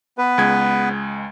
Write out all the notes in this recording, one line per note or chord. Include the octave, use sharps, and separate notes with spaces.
B3 B4
C#2 G#3 G#6